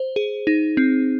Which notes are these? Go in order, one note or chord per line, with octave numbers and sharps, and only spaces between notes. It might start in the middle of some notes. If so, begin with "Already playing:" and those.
Already playing: C5
G#4
D#4
C4